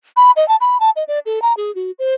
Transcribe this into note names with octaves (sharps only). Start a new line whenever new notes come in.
B5
D#5
A5
B5
A5
D#5
D5
A4
A#5
G#4
F#4
C5